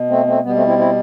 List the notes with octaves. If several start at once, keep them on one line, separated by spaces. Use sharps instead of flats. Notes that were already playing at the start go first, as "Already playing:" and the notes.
Already playing: B2
A3 C4
A3 C4
B2 G3 B3
A3 C4
C4 E4
C4 E4